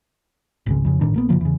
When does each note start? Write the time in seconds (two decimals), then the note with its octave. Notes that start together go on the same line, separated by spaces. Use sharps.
0.66 G#1 C#2 C#3
0.85 F2 C#3
1.01 G#1 A2 D#3 D4
1.14 A#1 A#3 B3
1.29 F#1 C#3 F3 A#3
1.41 E2 C#3